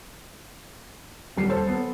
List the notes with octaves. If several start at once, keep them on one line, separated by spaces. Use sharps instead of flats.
D#1 G3 C7
A4 C5 C#5
B3